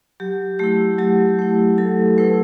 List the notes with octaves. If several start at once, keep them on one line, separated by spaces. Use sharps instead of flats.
F#3 G4
A3 E4 G4
F#3 G4
A3 E4
F#3 A4
A3 E4 B4